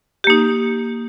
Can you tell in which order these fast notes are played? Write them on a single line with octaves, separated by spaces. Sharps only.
G4 A#3 D#4